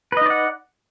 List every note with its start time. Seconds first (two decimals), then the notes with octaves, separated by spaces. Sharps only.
0.12 B4
0.17 D#5
0.21 D#4
0.26 D5
0.30 F#5